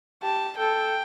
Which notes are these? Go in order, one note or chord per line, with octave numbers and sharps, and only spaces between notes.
G4 A5
A4 G5